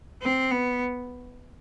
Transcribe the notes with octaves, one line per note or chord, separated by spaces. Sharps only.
C4
B3